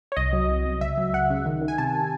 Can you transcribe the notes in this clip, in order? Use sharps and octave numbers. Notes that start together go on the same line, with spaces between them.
C#5
C2 D#5
F#3
C2
C2
C#2 E5
F#3
C#2 F#5
C#3
D#3
D#3
G#5
C3 A5